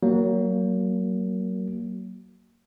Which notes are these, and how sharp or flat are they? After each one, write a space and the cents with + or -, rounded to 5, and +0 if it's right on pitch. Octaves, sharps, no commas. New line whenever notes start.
F#3 +25 A#3 +0